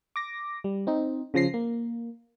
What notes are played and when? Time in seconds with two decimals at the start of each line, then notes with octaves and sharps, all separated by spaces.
0.16 D6 A#6
0.64 G3
0.87 C4 D#4
1.34 C#3 F3 A#6 C7
1.54 A#3